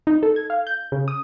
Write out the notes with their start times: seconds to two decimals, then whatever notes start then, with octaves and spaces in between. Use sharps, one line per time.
0.07 D#4
0.23 A4
0.36 G#6
0.50 F5
0.67 G6
0.92 C#3
1.08 D#6